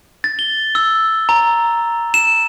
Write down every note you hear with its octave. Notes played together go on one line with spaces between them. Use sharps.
A6
G7
E6
A#5
E7